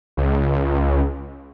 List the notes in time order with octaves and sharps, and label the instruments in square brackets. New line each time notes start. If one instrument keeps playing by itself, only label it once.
[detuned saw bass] C#2